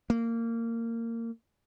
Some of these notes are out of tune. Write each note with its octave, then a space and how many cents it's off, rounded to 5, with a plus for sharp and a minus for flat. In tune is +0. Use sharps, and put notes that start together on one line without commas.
A#3 -20